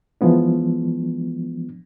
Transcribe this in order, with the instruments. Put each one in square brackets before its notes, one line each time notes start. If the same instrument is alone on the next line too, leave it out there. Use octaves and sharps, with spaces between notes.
[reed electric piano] E3 F3 G#3 B3 D4